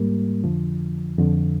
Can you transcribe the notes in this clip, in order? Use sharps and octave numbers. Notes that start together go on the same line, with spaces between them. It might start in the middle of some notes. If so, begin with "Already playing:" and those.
Already playing: G#2 G3 A#3
F2 D3 F3
F2 D3 F3